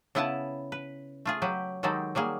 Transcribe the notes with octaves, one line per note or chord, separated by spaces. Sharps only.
C#3 B3 E4 B4 F#5 A5
B4
A3 F4 G#4
F#3 G4 B4
D#3 F#3 G#3 D#4 G4 A4
F#3 G3 A#3 G#4